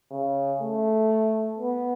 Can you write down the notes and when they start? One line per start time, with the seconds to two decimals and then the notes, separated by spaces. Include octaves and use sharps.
0.11 C#3
0.60 A3
1.59 B3